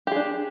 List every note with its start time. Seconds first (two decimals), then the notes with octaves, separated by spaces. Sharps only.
0.07 G4
0.12 G#4
0.16 D4